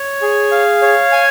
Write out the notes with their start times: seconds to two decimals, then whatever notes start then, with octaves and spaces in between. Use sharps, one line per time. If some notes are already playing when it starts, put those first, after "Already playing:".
Already playing: C#5
0.22 G#4
0.51 F5
0.82 C#5
1.12 G#5